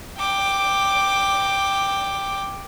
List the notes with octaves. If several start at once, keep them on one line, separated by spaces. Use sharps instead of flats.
G5 D6